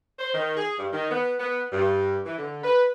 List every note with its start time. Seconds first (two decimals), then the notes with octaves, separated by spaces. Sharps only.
0.19 C5
0.34 D#3
0.57 G#4
0.78 G2
0.93 D#3
1.11 B3
1.39 B3
1.72 G2
2.26 E3
2.39 D3
2.63 B4